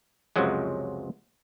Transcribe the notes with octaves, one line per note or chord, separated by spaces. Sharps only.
C#2 F#2 C3 F3 F#3 G#3